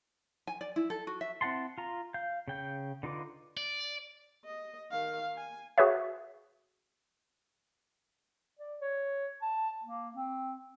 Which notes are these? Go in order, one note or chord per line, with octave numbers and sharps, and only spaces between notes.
G#5
D5
E4
A4
F#4
E5
C4 E4 F#5 A5 C6
F4 A#5
F5 G6
C#3 G5 G6
D3 D#4 F4 B4 D6
D5
D#5
D#3 F5
G#5
F#4 G#4 B4 C#5 E5
D5
C#5
A5
A#3
C4